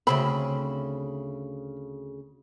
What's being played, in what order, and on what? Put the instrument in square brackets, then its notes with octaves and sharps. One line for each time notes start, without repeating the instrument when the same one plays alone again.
[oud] D2 C#3 C4 [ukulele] B5